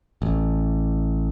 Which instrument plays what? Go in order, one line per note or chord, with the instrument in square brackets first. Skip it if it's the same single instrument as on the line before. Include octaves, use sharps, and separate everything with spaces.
[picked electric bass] A1